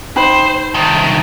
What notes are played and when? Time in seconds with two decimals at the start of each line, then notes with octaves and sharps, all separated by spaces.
0.16 D#4 C5 G5 B5
0.75 C2 D#3 A5